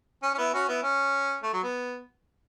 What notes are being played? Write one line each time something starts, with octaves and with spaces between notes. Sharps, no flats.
C#4
C#4
B3 E4
C#4 F#4
B3 E4
C#4
A3
F#3
B3